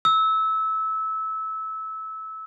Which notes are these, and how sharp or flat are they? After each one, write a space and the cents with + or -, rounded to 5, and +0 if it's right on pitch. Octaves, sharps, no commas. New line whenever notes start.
E6 -20